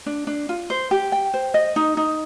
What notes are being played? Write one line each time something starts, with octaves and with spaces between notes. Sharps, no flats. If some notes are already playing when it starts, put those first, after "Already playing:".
D4
D4
F4
C5
G4
G5
C5
D#5
D#4
D#4